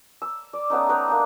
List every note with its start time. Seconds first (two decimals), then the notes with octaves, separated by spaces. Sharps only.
0.22 E6
0.53 D5
0.70 A3 B3 C#4 D#4
0.89 D#4 B4 G5 D6
1.08 A#3 D4 G5